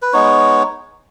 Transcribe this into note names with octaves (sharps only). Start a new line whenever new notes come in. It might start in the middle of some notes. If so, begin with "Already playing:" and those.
B4
G#3 B3 D#4 C#5